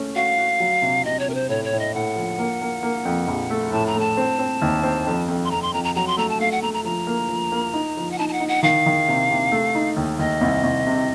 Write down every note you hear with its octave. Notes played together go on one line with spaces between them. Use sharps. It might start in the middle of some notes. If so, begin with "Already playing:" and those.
Already playing: A3 C#4
F#4 F5
F#4
F#3
C3
C3 D#5
C#5
C3 A#4
C5
A2 C#5
C#5
A2
D#5
A2 F#5
F3
A#3
A#3
A#3
F2
A#1
A3
A2 A5
A#5
A3 A5
C4
C4
D#2
C4
F2
F2
C6
F2 A#5
C6
F2 A#5
A#5
F#3 A#5
C6
A3 A#5
A5
A3 F5
F#5
A3 A#5
A#5
F3 A#5
A#3
F3
A#3
D#4
F3
F#5
D#4 A5
A5
F#5
D#4
F#5
D#3 F5
D#3
C3
C3
A3
D#4
D#2
D#2 D#5
C2
C2
C3